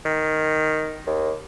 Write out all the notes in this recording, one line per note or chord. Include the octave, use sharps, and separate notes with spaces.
D#3
D#2